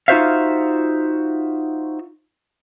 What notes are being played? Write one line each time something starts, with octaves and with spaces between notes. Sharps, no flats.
D#4 F4 F#4 C5 E5 F5